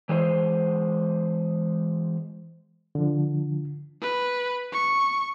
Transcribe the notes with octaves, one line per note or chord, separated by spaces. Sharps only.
E3 G#3 C5
D3 F3
B4
C#6